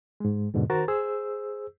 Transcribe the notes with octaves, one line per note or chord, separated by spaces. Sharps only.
G#2 G#3
E2 G#2 B2 D3
D#3 F#4 A#4 C5 A#5 A6
G#4 C5 E6